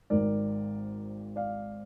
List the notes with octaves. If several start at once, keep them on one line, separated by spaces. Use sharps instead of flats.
G#1 G#2 D#3 A#4 D5
D5 F5